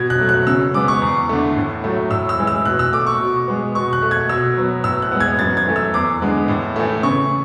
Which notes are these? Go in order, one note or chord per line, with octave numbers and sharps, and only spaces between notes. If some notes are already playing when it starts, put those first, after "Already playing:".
Already playing: B2 G#6
F#6
F#3 A3
F#6
C#3 E6
G#3 B3 D6
C#6
E2
D3 A3
A2
F#3 A3
A2 E6
E6
E3 G#3
E6
B2 F#6
E6
A3 D6
C#6
B2
G#3 B3
B2 C#6
F#6
A3
G#6
B2 E6
F#3 B3
A2 E6
F#6
G#3 B3
G#6
F#2 A6
G#6
E3 A3
E6
E2 D6
D3 G#3 B3
A2
E3 A3
C#3 C#6